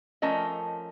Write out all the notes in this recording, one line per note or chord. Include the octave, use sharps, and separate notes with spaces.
F3 A3 C#4 A#4 D#5